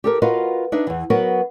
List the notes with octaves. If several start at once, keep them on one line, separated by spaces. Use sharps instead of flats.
G4 A4 A#4
F4 F#4 A#4 B4 D#5 F5
D4 D#4 B4 E5
E2 E3
F#3 B3 F#4 A#4 B4